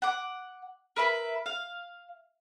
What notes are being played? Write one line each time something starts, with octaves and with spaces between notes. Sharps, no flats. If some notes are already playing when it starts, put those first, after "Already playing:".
F#5 D6
A#4 B4 E5 B5
F5